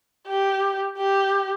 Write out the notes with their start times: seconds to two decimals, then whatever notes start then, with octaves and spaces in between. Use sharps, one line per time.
0.27 G4
0.98 G4